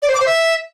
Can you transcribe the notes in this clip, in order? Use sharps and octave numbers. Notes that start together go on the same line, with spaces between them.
D5
C5
D6
C5
E5